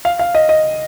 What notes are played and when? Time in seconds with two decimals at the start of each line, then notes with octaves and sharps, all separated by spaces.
0.05 F5
0.19 F5
0.35 D#5
0.49 D#5